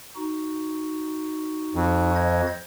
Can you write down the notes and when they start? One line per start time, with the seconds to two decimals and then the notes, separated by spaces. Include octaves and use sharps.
0.15 D#4 F#4
1.74 F2
2.16 C5 D#5 G#6